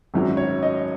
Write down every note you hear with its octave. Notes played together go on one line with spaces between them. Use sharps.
G#1 F#2 F#3
C#5
D#5